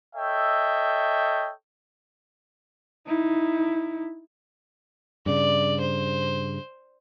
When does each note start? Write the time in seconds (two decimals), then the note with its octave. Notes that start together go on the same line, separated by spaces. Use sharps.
0.14 A4 C#5 D#5 E5 G5
3.07 D#4 E4
5.26 G2 C#3 D5
5.80 C5